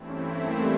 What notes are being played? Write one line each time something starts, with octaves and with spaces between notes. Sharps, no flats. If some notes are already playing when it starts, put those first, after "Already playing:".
Already playing: G2 E3 A3 C4 E4
C#4
B3
A#3
G3